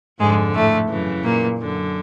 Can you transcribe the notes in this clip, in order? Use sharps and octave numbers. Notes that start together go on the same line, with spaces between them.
F2 G#2 D3 G#3
A2 A3
F#2 C#3 E3
A#2 A#3
F#2 D3